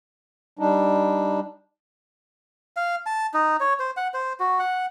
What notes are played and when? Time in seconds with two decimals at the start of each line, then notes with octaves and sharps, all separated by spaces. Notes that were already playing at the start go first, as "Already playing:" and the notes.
0.59 G3 D4 D#4
2.77 F5
3.06 A5
3.34 D#4
3.60 C#5
3.79 C5
3.97 F#5
4.14 C5
4.40 F#4
4.59 F#5